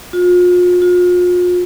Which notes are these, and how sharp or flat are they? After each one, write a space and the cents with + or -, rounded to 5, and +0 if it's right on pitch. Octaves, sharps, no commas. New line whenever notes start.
F4 +40
F4 +40